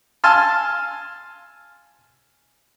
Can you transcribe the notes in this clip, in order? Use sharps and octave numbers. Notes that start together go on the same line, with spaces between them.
F5 G#5 A5 C6 E6 F6